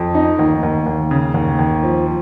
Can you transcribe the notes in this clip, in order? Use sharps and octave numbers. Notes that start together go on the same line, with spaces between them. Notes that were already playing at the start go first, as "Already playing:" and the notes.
Already playing: F2
D#4
D#2
D#2
D#2
C#3
D#2
D#2
F3
F3